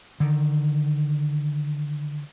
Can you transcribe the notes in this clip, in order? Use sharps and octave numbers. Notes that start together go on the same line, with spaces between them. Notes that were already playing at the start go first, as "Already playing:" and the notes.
D3 D#3